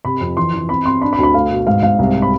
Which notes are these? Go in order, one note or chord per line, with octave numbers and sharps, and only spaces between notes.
C3 B5
F2
E3 C6
E3
C4 B5
C4 C6
D4 B5
B5
D2
B5
A3 F5
B2
G#2 F5
G#2 F5
C2
B5